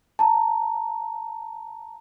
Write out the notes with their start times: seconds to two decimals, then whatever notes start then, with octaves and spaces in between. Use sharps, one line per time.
0.19 A5 A#5